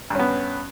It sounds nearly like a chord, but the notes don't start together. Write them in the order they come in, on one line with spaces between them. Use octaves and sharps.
G2 C#4 B3